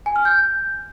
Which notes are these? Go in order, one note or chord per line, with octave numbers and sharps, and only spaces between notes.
G#5
F6
G6